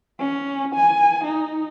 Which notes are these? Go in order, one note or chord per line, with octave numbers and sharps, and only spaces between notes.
C#4
G#5
D#4